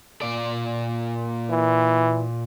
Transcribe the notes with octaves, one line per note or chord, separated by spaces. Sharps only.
A#2 D5
E3